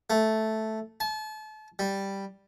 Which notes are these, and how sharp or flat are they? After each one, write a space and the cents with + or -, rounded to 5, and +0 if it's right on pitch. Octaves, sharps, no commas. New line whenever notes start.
A3 -5
A5 -35
G3 +0